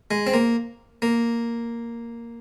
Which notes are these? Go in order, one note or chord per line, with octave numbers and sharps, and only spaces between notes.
G#3
C4
A#3
A#3